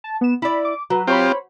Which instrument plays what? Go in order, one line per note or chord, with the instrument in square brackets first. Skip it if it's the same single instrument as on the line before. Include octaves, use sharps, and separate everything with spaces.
[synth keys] A5
B3 E7
[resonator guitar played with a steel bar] E4 D5 [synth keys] B5
[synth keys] D6
[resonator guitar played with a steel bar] F#3 [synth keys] F#4 B4
[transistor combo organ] C4 F4 G4 [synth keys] C5 C#5 B5